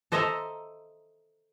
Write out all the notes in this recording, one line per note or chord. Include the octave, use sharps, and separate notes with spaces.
A4 C5 D#5 E5 A5 A#5